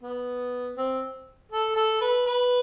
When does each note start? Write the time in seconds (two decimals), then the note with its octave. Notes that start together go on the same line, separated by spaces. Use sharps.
0.03 B3
0.77 C4
1.52 A4
1.76 A4
2.01 B4
2.26 B4